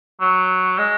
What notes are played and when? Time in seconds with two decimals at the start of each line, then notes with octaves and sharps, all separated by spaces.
0.21 F#3
0.78 G#3